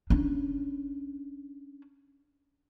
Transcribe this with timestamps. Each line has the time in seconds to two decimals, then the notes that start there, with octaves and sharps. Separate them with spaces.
0.10 C#4 D4